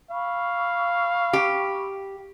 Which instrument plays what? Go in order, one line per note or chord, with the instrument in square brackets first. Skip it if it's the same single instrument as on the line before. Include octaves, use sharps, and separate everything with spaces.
[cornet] F5 [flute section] B5 C#6 E6
[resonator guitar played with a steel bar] G4